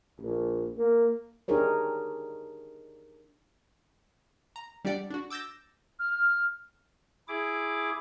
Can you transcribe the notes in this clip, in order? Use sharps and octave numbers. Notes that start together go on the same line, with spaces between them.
A#1
A#3
D4 D#4 G4 G#4 A#4 C#5
A#5
G3 D4 G4 D5 F#5
D4 F#4
D6 E6 G6 A6 A#6
F6
E4 G#4 D6